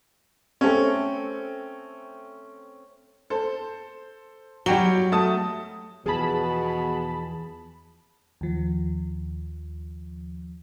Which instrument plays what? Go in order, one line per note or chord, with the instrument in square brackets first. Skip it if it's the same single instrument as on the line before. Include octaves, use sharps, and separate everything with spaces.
[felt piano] A3 C4 C#4
[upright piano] A4 C5
[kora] F#3 [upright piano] G3 G5 G7
[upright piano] A3 A5 D#6
[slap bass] E2 F3 [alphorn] B2 [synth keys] G#4 A5 B5
[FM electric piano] D#2 F3